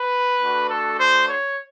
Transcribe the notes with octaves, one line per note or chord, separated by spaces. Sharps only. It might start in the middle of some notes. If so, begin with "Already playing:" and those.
Already playing: B4
A3 D4 F#4
A4
C5
C#5